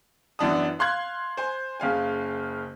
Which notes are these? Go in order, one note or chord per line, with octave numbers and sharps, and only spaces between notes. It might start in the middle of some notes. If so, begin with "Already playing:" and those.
F#2 E3 B3 D4 A5 D#6
F5 C6 F#6 G#6
C5 G#5
F#1 C#3 F5 G#5